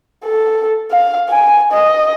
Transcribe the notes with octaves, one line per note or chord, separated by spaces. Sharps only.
A4
F5
G#5
D#5